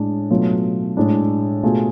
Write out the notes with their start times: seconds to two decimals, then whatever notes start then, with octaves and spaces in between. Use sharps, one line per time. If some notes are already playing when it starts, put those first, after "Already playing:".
Already playing: A2 G#3 D4
0.31 B2 F#3 A3 F4
0.97 A2 G#3 D4
1.63 B2 A3 F4 G#4